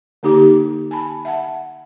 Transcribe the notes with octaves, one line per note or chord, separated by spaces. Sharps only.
D3 A#3 D#4 G4 D6
G#5 A5 B5
E5 F#5 A5